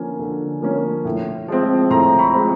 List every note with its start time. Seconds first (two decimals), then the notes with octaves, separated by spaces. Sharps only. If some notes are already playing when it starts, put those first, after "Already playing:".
Already playing: D3 F3 A#3 C#4 G#5
0.19 D3
0.61 F3 A#3 C#4
1.05 A2
1.48 F3 G#3 C4
1.90 A2 A#5 C6
2.19 B5 C#6
2.33 F3 G#3 C4